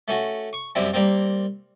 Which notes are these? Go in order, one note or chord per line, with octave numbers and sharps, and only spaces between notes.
A3 C#4 F#4
C#6
F#2 G3 C4 E4
G3 A#3 C4